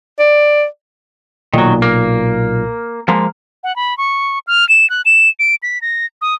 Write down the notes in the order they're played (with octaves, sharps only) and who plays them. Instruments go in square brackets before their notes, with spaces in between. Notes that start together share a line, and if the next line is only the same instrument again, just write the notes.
[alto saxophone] D5
[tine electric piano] B1 A#2 [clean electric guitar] D#3 F#3
[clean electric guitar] A#3
F3 G#3 A#3
[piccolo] F#5
B5
C#6
F6
E7
F#6
E7
D7
B6
A#6
D#6